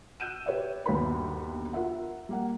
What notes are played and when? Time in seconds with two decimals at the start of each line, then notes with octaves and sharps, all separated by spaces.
0.20 E6 F#6 G6 D#7 E7
0.46 G4 B4 C#5 D5 E5
0.86 G1 D#2 B2 F#4 B4 B5
1.73 F4 A#4 E5 F#5
2.29 G3 A#3 F#5